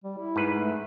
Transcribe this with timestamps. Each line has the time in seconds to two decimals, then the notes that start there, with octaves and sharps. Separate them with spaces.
0.04 G3
0.18 E4
0.36 G#2 B4
0.53 A3